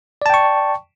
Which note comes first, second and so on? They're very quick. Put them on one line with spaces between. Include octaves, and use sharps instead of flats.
D5 A5 G5 C#6